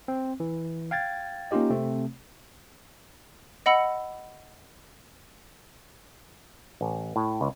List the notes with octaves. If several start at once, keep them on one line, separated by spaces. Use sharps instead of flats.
C4
E3
F5 G5 G#6 A6
A#3 C#4 D#4 F4 G4 D#5
C3 A3 C4
D#5 F#5 B5 E6 C#7
A1
A2
C#2